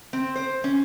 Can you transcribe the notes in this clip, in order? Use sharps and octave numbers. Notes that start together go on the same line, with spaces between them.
C4
C5
C#4